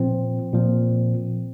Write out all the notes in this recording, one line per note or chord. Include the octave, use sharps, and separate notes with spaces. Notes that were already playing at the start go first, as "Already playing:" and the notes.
Already playing: A#2 F3 C4
A#2 F3